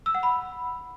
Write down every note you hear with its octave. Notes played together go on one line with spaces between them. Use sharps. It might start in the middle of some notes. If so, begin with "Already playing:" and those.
E6
F#5
B5